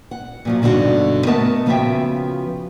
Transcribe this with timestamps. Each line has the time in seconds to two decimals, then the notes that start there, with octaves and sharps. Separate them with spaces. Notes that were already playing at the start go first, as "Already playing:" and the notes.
0.11 F#5
0.45 A#2 F3 F#3
0.62 G2 B2 D3 D#4 F#4
1.26 A3 B3 A#4 D#5 F#5 A5
1.66 C#3 F3 B3 F#4 E5 G5